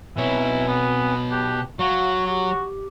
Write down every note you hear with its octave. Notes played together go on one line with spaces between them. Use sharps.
B2 C4 E4 B4 C#5 G#5
B3
G4 A5 F#6
F#3 F#4 F5
F#4 G4